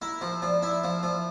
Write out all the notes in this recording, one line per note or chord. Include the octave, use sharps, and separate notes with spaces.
E4 A#4
F3 C5
F3 D5
E4 E5
E5
F3 F5
F3 E5